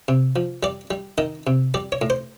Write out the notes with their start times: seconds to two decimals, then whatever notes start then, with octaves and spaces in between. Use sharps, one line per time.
0.08 C3
0.36 F3
0.63 G3 D5
0.91 G3
1.18 D#3 D#5
1.47 C3
1.74 G3 D5
1.92 C#5
2.02 A2
2.10 C5